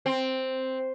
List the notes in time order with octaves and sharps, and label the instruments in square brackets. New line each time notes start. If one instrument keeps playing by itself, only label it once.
[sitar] C4